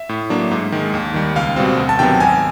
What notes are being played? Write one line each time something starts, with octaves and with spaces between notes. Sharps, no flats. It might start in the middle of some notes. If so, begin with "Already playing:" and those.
Already playing: E5
A2
F#3 A#3 D4
G#2
D#3 G#3
D#2
D#3 G3
C#2 F5
B2 G3 C4
D2
A5
C3 D#3 F#3 B3 G5
G#1 G#5